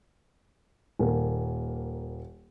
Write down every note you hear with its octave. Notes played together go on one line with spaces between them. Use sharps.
D#1 A#3